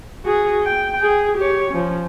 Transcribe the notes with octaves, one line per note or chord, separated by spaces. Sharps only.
F#4 G#4
G5
G#4
G4 C#5
F3 C#4